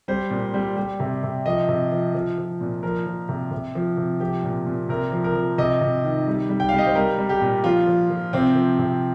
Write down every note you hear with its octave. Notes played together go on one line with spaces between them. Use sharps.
G3 C5
A#2
G3
G3
C3
C3
F3 D#5
C3
F3
F3
F3
A#2
F3 A#4
F3
C3
C3
F3
C3
F3 G4
A#2
A#2
C3 A#4
F3
A#4
F3
C3 D#5
C3
D#3
G3
G3
G5
F5
G3
D#5
C5
G3 A#4
G3
G4
A#2
F3 F4
F3
F3
C3 C4
F3
C3